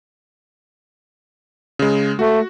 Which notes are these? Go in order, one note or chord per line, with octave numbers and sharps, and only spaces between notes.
C#3 G#3
A3 F#4